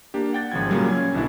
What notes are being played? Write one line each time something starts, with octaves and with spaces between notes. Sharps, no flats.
A#3 D4 G4
F#5 G5 A6
G#1 C#3 F3 F4 G#6
A#2 C#3 F#3 G3 A#3
C#4 G#6
B1 B2 D3 D4 E4